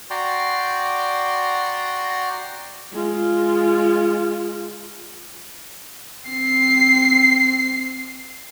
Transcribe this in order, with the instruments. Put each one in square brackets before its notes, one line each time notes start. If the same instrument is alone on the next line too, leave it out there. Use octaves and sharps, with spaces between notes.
[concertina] F#4 D5 G5 A#5 C6
[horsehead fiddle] G#3 F4
[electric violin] C4 C7